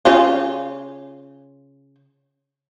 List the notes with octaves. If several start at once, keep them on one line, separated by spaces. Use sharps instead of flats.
C#3 C#4 F4